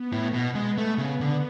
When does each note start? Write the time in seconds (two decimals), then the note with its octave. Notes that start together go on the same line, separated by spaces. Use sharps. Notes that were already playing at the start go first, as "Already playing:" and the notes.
Already playing: B3
0.12 A2
0.34 B2
0.55 G#3
0.78 A3
0.98 C#3
1.20 D3